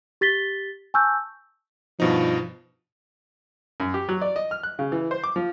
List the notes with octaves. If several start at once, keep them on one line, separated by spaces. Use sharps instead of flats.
G4 A6 B6 G7
G#5 A5 C#6 E6 F#6 G6
G2 B2 F3 D#4
F#2
G4
F#3
D5
D#5
F6
F#6
C#3
E3
C5
D6
F3